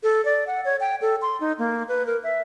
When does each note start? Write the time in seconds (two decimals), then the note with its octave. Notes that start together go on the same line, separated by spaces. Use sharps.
0.03 A4
0.25 D5
0.47 F#5
0.65 C#5
0.80 G5
1.01 A4
1.22 C6
1.40 D#4
1.59 A#3
1.88 B4
2.06 A#4
2.24 E5